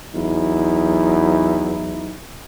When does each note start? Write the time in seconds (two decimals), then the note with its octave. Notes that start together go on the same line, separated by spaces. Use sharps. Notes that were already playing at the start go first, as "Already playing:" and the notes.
0.15 E2 F#3 D#4 E4